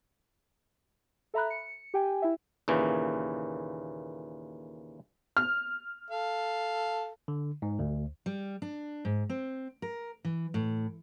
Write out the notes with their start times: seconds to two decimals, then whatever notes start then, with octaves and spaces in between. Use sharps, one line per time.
1.34 A4 E5 A#5 B5 F#6
1.50 C#7
1.94 G4 G5 G#5
2.22 E4 E5
2.68 D#2 A#2 C#3 E3
5.37 F6
6.11 A4 F5
7.28 D3
7.62 G#2
7.79 D2
8.26 G3
8.62 D4
9.05 G#2
9.30 C4
9.82 A#4
10.25 E3
10.54 A2